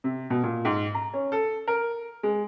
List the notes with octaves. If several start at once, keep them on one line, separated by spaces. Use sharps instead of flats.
C3
B2
A#2
G#2
A#5
C#4
A4
A#4
G#3